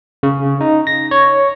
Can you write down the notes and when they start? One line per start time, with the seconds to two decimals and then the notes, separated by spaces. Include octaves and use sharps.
0.23 C#3
0.61 D#4
0.87 A#6
1.11 C#5